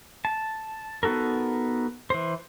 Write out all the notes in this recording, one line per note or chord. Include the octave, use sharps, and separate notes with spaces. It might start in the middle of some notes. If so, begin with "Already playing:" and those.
A5
B3 D#4 F#4 A4 A#4
E3 C5